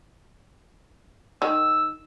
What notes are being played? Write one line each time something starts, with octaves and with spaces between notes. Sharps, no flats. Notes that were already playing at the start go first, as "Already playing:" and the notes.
D#3 E6